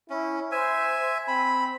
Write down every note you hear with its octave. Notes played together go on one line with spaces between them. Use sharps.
C#4 E4
C5 E5 G#5
C4 B5